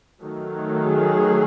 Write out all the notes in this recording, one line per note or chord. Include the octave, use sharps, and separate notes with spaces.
D#3 F#3 A3
G#4